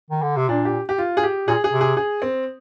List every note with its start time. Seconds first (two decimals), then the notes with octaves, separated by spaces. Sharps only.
0.10 D#3
0.22 D3
0.36 C3
0.48 A#2 D4
0.65 G4
0.89 G4
0.98 F4
1.17 G#4
1.23 G4
1.48 A#2 G#4
1.64 G#4
1.72 C3
1.81 G#4
1.97 G#4
2.22 C4